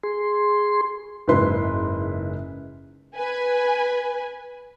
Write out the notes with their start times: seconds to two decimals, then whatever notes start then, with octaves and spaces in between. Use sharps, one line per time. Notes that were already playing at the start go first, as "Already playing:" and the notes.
0.03 G#4 C6
1.28 F#1 G#2 C#3 E4 B4 C6
3.17 B4 G#5